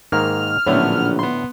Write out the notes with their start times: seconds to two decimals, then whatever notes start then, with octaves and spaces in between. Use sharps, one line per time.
0.12 G#2 D#3 A#3 F6
0.67 A#1 A2 D3 F#3 A3 B3 C#4
1.19 B3 C6